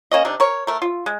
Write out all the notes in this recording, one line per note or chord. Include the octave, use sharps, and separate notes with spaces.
A#3 C#4 D#5
C3 D4 D#4
A#4 C#5
A3 A#4
F4
G#3